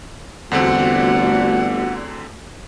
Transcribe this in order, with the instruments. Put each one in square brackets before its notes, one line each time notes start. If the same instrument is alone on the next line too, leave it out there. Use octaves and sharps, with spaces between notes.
[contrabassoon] G1 [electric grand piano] E2 D3 C4 [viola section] A3 F#4 D5 [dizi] F#5